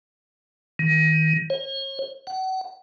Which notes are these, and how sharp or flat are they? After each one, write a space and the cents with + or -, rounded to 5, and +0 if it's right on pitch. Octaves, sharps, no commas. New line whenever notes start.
D#3 +25
C#5 -40
F#5 +35